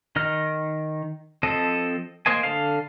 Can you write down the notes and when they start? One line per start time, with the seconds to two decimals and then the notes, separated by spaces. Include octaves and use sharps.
0.16 D#3 D#5 F6
1.43 F3 C4 A4 D#5
2.26 A#3 C5 D#5 G#5
2.43 D3 A4 F5